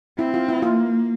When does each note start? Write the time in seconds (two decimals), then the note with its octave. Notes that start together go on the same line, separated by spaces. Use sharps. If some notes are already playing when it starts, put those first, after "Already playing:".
0.19 C4 E4
0.34 F4
0.49 E4
0.62 A#3 F4